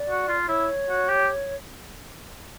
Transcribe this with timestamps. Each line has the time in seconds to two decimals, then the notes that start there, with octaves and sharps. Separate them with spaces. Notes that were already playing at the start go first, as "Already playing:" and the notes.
Already playing: D5
0.10 F#4
0.28 F4
0.48 E4 C#5
0.89 F#4
1.09 G4